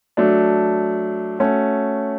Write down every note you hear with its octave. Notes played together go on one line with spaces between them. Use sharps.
F#3 A3 D4
A3 C#4 F#4